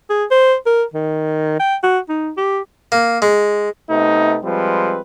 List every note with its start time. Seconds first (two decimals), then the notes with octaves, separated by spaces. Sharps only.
0.10 G#4
0.31 C5
0.66 A#4
0.94 D#3
1.60 G5
1.83 F#4
2.09 D#4
2.37 G4
2.92 A#3
3.22 G#3
3.90 C3 A3 B3 D#4
4.44 F3 G3 G#3 C4 B4